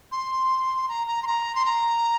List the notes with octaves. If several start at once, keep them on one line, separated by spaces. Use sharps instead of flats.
C6
A#5
A#5
C6
A#5
C6
A#5